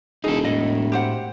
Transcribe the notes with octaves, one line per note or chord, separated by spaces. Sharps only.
E1 D#4 G#4 A4
A2 D#5
G4 C5 F#5